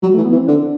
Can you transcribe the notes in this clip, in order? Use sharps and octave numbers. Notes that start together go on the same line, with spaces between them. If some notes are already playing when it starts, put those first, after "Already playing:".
F#3 G3
E3 A3
B3
E3
C4
D3 D4